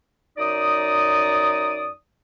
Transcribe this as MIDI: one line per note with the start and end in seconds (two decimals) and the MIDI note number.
0.37 1.91 42
0.37 1.91 63
0.37 1.91 74
0.37 1.91 87